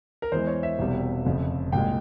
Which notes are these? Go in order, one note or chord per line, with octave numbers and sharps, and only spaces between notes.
A#4
E2 E3 G#3 C5
C#5
E5
E1 E2 C3 G3
F1 F2 C#3
C2 A#2 G#3 G5